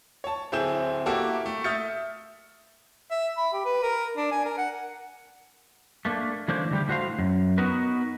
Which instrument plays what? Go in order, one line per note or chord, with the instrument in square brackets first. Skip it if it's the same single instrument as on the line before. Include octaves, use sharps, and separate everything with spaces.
[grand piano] C#5 A5
D1 C4 E4 G#4 G6 E7
A#3 E4 F#4 G4 A4
A3
E5 D#6 F6 G6 A6 C#7
[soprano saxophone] E5
B5
G4
B4
A#4
D4
G#5
A#4
F#5
[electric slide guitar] A3 A#3 D4
E3 A3 A#3 C#4 D4 C5
D3 G3 G4
A2 F#4 C5 F5
F#2
B3 D#4 F#4 A#4 B4